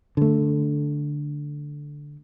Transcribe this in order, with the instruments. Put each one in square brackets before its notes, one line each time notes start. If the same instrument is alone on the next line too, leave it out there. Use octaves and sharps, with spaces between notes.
[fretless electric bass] D3 A3